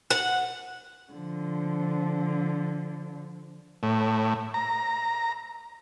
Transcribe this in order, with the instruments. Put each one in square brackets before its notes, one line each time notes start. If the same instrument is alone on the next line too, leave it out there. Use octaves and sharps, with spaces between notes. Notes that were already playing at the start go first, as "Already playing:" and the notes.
[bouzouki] F#5
[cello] D3 F3
[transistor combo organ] A2
A#5